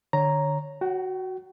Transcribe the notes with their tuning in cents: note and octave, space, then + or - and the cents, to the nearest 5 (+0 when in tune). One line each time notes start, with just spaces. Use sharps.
D3 +25 C#5 +0 A#5 +0
F#4 +0 G5 -40